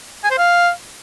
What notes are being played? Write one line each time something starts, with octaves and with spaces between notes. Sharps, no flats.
G#5
C5
F5